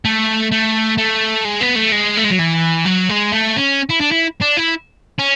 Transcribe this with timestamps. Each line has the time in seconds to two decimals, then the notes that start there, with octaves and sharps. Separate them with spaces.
0.05 A3
0.51 A3
0.98 A3
1.45 G#3
1.61 B3
1.76 A3
1.92 G#3
2.17 A3
2.24 G#3
2.31 F#3
2.39 E3
2.85 F#3
3.09 G#3
3.32 A3
3.56 C#4
3.89 E4
4.00 D4
4.11 E4
4.41 D4
4.57 E4
5.19 C#4